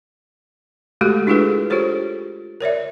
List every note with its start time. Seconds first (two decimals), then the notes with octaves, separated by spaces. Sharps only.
1.01 G#3 A3 F#4 G4 A4
1.27 D4 E4 F4 G#4 A4 B4
1.70 F4 G4 A4 C5 C#5
2.61 A#4 C#5 D5 E5